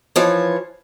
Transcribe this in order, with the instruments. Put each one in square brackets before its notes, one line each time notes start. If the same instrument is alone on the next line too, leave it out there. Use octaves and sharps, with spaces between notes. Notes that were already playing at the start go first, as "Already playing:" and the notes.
[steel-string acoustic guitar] E3 F3 C#5